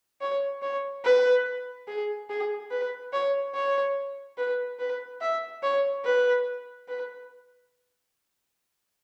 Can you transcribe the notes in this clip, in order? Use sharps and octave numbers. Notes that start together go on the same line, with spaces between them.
C#5
C#5
B4
G#4
G#4
B4
C#5
C#5
B4
B4
E5
C#5
B4
B4